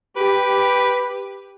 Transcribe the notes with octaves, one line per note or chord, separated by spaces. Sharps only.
G4 B4